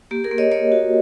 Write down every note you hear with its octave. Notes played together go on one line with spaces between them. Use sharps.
A#3 G4
G#4 A#4
A#3
C#5 D#5
A#3 C#5 D#5
F#4